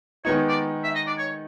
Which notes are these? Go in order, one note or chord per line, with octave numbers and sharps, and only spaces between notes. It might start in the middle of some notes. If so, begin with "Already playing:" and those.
D#3 G#3 B3 D#4 C#5
D5
E5
D#5
D5
C#5